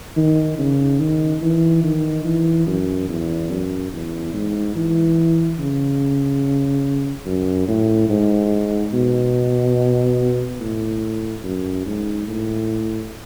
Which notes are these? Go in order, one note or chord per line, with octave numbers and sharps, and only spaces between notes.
D#3
C#3
D#3
E3
D#3
E3
F#2
E2
F#2
E2
G#2
E3
C#3
F#2
A2
G#2
B2
A2
F#2
G#2
A2